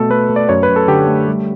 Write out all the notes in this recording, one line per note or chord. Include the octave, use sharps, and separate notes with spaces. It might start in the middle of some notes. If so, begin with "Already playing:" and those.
Already playing: B2 A3 A4
A3 B4
A3
D5
F#2 C#5
B4
F#2
A4
D3 G4
A3
G3